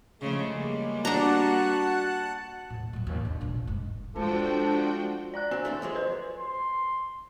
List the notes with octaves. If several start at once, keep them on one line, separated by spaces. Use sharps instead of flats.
C#3 F3 G#3 A3
G3 A#3
D4 F#4 F#5 A5 A#5 F#6
D#2 A2
A2 F#3
D#2
D3
F1 A#1
G#2
F3 G#3 D4 F#4 A4 G5
D5 A#5 F#6
C4 D4 F#4 G#5
D2 E3 A3
F3 F#3 G#3
B4 C5 C6
C6